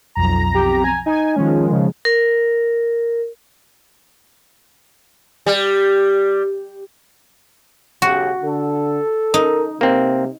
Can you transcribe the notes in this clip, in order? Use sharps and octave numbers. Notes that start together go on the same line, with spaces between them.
B1 F2 A#5
G4
G#5
D#4 G#5
D#3 F3 G#3 C#4
C#3
A#4
G3
B1 C#3 F#4 G4
D3 A4
D#4 A#4
C3 A#3 C4